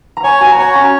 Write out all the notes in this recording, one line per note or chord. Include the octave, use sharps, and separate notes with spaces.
A#5
C#5 G#5
F#4 G#5
A#5
C#5 G#5
C#4 A#5